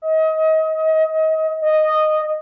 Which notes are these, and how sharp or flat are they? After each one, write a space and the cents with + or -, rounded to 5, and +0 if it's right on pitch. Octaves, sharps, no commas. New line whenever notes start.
D#5 +30
D#5 -10